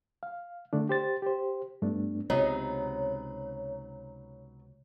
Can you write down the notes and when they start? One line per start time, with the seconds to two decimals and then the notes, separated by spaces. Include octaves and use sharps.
0.23 F5
0.73 D3 A3 D4
0.89 G4 C5 A6
1.22 G4 C5
1.82 G2 A3 B3 D4
2.30 C#2 C3 F#3 B3 D#4 C#5